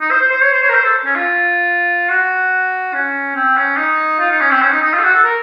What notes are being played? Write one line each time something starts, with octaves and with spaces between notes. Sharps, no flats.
D#4
C5
C5
C5
C#5
C5
C#5
A#4
C5
A4
C#4
F4
F#4
C#4
C4
C#4
D#4
F4
D#4
C#4
C4
C#4
D#4
D#4
F4
A4
F#4
A4
A#4